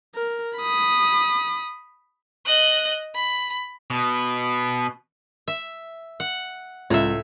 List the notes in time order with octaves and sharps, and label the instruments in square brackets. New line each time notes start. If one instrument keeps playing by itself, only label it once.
[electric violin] A#4
B5 D#6
[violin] D#5 F#6
B5
[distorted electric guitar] B2
[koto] E5
F#5
[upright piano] C#2 [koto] A2 E5